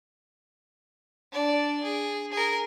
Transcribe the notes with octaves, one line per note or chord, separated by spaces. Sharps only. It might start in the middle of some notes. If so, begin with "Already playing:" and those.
D4 D5
G#4
G#4 A#4